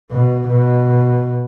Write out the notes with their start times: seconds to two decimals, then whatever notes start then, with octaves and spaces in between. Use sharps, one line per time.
0.11 B2
0.49 B2